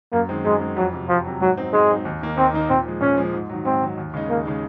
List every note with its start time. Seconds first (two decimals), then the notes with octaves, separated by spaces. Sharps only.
0.12 F#2 A#3
0.29 D#3 G#3 C4
0.45 F#2 G#3
0.61 D#3 G#3 C4
0.77 F2 F#3
0.93 C3 F#3
1.08 F2 F3
1.24 C3 F#3
1.41 G#2 F#3
1.57 F#3 C4 D#4
1.73 G#2 G#3
1.89 F#3 C4 D#4
2.05 D#2
2.21 D#3 A#3 D#4
2.37 D#2 C4
2.53 D#3 A#3 D#4
2.69 A#2 C4
2.86 F3 G#3
3.01 A#2 C#4
3.17 F3 G#3
3.33 G#2
3.49 D#3 F#3
3.65 G#2 C4
3.82 D#3 F#3
3.97 D#2
4.14 C#3 G#3 D#4
4.29 D#2 A#3
4.46 C#3 G#3 D#4